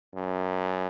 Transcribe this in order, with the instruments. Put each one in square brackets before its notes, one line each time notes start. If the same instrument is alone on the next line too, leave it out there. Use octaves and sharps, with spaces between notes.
[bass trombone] F#2